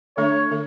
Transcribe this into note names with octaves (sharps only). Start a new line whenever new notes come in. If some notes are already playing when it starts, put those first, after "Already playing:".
D3 A3 D4 A4 C#5 E5
D3 A3 A4